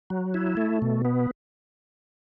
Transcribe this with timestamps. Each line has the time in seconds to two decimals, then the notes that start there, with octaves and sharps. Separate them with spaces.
0.10 F#3
0.34 E4
0.57 A3
0.82 B2
1.05 B3